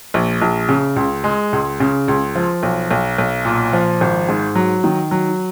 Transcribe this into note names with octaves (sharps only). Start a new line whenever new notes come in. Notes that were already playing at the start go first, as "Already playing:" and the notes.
A#1
A#1
C#3
C#2
G#3
C#2
C#3
C#2
F3
B1
B1
B1
A#2
F3
G#1
G#2
F#3
D#3
F#3